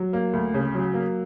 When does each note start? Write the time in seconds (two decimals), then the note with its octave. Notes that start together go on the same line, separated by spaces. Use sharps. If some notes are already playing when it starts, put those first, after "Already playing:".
Already playing: F#3
0.13 A#3
0.33 D2
0.54 C#3
0.75 F#3
0.94 A#3